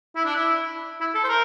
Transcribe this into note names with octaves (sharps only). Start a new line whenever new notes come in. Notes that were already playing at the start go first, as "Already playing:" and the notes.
E4
D4
E4
E4
A4
C5
A#4